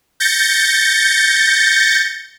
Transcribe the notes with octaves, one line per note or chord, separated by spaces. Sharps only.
G6 A6 A#6 C#7